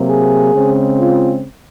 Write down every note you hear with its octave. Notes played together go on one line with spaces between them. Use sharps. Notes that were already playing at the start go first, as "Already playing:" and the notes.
Already playing: C3 F#3 A#3
G#4
C#3 G#3 C4
F4